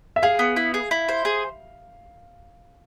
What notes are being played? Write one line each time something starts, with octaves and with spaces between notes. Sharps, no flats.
E5
G#4 F5
B3
E4
G#4
E4
C5
G#4